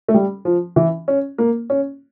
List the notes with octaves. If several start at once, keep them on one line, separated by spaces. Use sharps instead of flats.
A3
G3
F3
E3
C#4
A#3
C#4